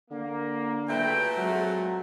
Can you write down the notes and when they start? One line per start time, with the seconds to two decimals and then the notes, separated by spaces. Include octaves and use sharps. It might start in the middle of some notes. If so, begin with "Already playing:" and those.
0.11 D3 A#3
0.88 F#1 A#2 A3 B4 G5
1.38 F#3 G#3 C4 F#5